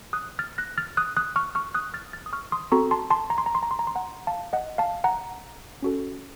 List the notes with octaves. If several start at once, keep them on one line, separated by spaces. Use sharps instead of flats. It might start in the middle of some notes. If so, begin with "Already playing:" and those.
D#6 F#6
F6 A6
F#6 A#6
F6 A6
D#6 F#6
D#6 F#6
C#6 F6
C#6 F6
D#6 F#6
F6 A6
F6 A6
D#6
C#6 F6
C6 D#6
C4 F#4 A4 A#5 C#6
A5 C6
A5 C6
A#5
C6
A#5
C6
A#5
C6
A#5
C6
F#5 A#5
F5 A5
D#5 F#5
F5 A5
F#5 A#5
C#4 F#4 A4